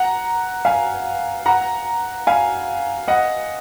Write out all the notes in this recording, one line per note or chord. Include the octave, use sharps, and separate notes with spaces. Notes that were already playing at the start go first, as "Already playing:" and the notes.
Already playing: F#5 A#5
F5 G#5
F#5 A#5
F5 G#5
D#5 F#5